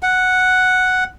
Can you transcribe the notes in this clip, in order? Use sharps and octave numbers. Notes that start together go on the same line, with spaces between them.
F#5